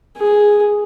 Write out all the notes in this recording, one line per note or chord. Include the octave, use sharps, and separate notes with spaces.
G#4